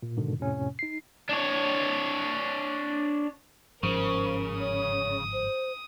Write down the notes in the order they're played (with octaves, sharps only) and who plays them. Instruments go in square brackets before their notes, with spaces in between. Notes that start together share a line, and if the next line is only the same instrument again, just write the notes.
[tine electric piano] A#2
G#2 B2 D3 D#3
F2 A2 C3 C#4
D#4 C7
[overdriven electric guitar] D4 C#5
[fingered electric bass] G1 G#2 F3 [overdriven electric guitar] C#3 [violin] A#4 [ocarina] C5
[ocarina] C#5 [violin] D#6
[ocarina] C5